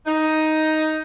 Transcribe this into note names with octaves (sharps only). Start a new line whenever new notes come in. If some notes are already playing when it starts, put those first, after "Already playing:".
D#4